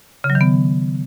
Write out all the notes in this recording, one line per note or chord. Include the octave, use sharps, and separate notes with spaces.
C#3
F#3
D#3
B3